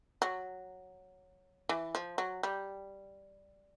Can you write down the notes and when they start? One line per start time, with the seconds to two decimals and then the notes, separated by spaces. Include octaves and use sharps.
0.22 F#3
1.69 E3
1.95 F3
2.18 F#3
2.43 G3